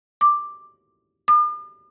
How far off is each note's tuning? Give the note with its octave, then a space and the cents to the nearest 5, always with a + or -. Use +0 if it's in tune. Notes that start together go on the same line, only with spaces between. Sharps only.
D6 +5
D6 +45